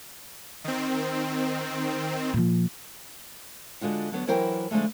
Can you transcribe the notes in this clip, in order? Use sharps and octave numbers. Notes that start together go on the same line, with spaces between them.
D#3 C4
A#2 F3
D3 G#3 F4 F#4
D3 F#3 B3
E3 F#3 E4 A#4 C5 G5
D3 F3 G#3 A3